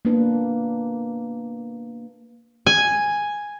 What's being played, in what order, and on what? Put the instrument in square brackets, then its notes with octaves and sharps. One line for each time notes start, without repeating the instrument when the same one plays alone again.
[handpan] A#3 B3 D4 B4
[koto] G#5